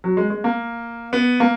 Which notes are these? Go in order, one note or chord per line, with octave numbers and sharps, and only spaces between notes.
F#3
G#3
G#3
A#3
B3
A#3